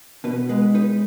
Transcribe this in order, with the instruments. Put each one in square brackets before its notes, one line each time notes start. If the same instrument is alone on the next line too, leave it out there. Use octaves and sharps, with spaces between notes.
[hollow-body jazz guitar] B2 B4
G#3 B4
D#4 B4